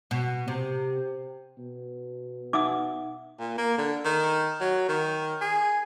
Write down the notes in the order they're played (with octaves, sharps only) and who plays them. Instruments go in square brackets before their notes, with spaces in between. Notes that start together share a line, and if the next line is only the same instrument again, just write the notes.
[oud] B2
C3
[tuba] B2
[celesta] D#4 E5 F#5 [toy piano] D6 D#6
[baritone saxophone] A#2
A#3
D3
D#3
F#3
D#3
G#4